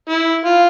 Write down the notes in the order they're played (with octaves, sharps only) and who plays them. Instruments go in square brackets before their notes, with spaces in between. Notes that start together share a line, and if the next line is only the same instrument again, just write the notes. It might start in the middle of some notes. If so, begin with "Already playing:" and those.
[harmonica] E4
F4